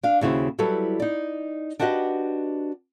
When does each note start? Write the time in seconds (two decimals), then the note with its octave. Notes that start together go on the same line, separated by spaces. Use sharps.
0.03 D4 F5
0.21 D#2 C#3 E4 F#4 C5
0.59 F#3 G3 E4 A4 B4
1.00 D#4 D5
1.79 D4 F#4 G4 B4 D#5 F#5